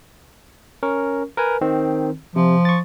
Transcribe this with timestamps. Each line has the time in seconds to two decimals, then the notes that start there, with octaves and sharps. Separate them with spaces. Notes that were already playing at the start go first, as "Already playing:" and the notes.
0.83 C#4 A#4 C#6
1.37 A#4 B4 G#5
1.61 D#3 C4
2.36 C3 F3
2.65 C#6 A6